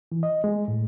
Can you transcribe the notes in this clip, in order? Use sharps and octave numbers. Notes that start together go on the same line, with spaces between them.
E3
D#5
G#3
A2